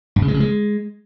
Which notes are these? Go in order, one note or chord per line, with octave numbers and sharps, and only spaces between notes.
G2
C#3
G#3
C#3
G#3